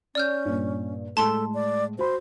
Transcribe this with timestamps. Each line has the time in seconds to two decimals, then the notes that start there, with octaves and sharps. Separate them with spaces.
0.15 C#4 D5 F6 G6
0.46 G2 A#2
1.17 A2 G#3 A4 A5 C6 G7
1.54 D5
1.99 F#4 C5 B5